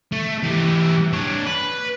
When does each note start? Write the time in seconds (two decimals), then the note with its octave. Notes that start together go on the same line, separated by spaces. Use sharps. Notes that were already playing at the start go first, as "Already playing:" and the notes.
0.12 A3
0.43 E3 G4
1.13 D4 C#5
1.46 B4